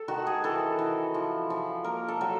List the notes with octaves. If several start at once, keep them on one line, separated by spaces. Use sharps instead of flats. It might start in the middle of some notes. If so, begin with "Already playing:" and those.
Already playing: A4
D#3 F#4
G#4
E3 A4
E3
F3
F3
A#3 A#4
A4
F#3